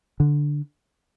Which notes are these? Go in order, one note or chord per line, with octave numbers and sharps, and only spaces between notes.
D3